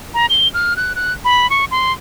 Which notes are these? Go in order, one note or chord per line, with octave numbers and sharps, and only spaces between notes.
A#5
G7
F6
F#6
F#6
B5
C#6
C6